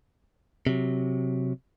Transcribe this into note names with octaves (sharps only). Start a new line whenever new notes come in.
C3 F#3